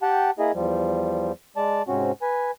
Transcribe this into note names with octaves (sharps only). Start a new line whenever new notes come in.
G4 F#5 G5 A5
A#3 E4 G#4 D#5
E2 F3 G3
G#3 D5 A5
G#2 C3 C4 C#4 F#4
B4 G#5